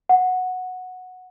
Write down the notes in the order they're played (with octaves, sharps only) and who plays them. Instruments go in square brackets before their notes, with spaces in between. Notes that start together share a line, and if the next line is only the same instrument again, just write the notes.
[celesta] F#5